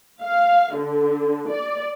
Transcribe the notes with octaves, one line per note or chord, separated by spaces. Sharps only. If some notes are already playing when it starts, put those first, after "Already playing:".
F5
D3
D5